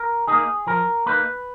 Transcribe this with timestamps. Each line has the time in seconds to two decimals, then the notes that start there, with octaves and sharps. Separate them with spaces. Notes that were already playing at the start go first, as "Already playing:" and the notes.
Already playing: A#4
0.27 A#3 D#4 G#4
0.67 F3 A#4
1.06 A#3 D#4 B4